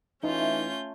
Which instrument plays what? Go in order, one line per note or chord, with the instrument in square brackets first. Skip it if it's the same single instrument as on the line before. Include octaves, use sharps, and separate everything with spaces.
[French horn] E3 [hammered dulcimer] A3 [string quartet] C#4 F4 G6 [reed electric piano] D#4